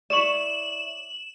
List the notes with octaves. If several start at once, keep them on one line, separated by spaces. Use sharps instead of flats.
E4 C#5 D5 E7 F#7